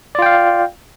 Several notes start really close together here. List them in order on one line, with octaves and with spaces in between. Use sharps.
D5 F4 G5 F5